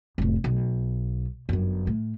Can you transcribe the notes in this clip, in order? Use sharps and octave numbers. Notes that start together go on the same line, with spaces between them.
F1 A2
B1
G1 F#2
A2